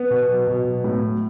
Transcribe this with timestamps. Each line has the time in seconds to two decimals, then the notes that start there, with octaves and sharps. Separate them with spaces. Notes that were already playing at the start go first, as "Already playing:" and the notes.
Already playing: B3
0.10 B2
0.28 F#3
0.47 B2
0.65 F#3
0.84 A2
1.02 F#3